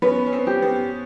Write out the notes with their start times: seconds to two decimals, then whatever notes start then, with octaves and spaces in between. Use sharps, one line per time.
0.02 B3 C#4 B4
0.26 C#4
0.33 C4
0.47 G4
0.62 B3